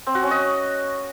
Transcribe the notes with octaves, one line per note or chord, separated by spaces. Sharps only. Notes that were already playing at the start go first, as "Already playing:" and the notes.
C4
F#4
C#4
D#5